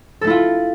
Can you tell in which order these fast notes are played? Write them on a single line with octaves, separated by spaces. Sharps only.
A4 A3 E4 F4